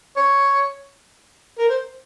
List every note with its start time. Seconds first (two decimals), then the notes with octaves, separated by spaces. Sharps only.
0.17 C#5
1.58 A#4
1.69 C5